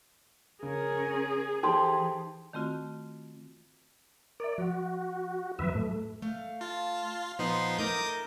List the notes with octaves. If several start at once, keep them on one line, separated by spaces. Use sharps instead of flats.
C#3 C#4 G#4 A#4
E3 D#4 G4 A4 C5 C6
D#3 A3 C4 F4 F#4
A#4 D5 E5
F3 F#4
F2 D#3 F#3 B4 E5
A2 A3
A3 F5
F4 A5
A#2 F3 B3 D#4 C6
A3 D#4 A#4 D6 D#6 G6